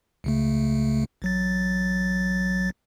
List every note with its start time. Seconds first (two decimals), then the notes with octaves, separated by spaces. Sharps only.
0.24 C#2 C#3 A3
1.22 A1 F#3 A6